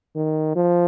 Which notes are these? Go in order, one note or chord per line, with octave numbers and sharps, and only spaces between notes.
D#3
F3